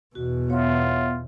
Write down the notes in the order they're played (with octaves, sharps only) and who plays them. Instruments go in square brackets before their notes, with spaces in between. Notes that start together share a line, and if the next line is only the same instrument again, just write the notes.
[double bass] E2 B2 [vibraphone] F#4
[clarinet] B3 [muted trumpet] F4 [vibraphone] C#5 E5